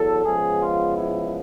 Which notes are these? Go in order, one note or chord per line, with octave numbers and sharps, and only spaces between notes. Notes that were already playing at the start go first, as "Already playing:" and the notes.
Already playing: E2 F#3 A4
C#3 F3 G#3 B3 G#4
F4
E4